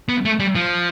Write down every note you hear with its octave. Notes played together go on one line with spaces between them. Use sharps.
B3
A3
G3
F3